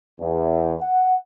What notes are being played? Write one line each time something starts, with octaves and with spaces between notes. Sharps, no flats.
E2
F#5